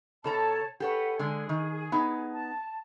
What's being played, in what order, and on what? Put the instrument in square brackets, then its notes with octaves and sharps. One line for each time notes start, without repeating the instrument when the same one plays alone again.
[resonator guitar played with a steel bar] B2 A4 A#5 [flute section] C#5 A5
[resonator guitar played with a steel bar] G4 A4 C#5 [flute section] B4 F#5
[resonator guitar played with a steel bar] D3 G#3 [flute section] G#4
[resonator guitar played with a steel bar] D#3
B3 D#4
[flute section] A5